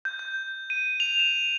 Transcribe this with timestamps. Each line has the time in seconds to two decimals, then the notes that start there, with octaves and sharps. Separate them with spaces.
0.05 G6
0.19 G6
0.70 D#7
1.00 F7
1.19 E7